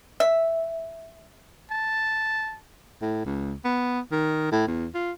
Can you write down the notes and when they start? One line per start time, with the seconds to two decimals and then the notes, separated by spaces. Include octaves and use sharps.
0.20 E5
1.71 A5
3.02 A2
3.26 C#2
3.65 B3
4.12 D#3
4.52 A2
4.68 E2
4.95 F4